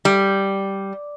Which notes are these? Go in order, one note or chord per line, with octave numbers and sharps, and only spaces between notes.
G3